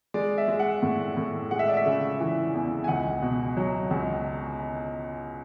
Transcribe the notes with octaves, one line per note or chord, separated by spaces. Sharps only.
G#3 D5
E5
G#3
F#5
A2
A2
G#3 F#5
E5
D5
E5
C#3
E3
E2
G#5
C#2 F#5
B2
F#3
C#2